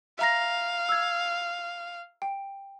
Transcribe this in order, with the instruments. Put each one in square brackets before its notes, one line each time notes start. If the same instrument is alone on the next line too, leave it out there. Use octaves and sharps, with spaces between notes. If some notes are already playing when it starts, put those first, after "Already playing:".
[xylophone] E5 A#5 A#6 [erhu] F5
[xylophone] E6 G#6
G5